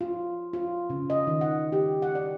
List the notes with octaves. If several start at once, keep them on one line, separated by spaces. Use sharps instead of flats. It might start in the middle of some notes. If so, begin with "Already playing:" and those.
F4
F4
C#3
D#5
D#3
F#5
G4
F#5
D5